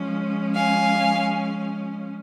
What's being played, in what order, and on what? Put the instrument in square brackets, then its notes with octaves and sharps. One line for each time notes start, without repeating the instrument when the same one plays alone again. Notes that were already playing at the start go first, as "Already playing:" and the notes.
Already playing: [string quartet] F3 G#3 C#4
F5 G#5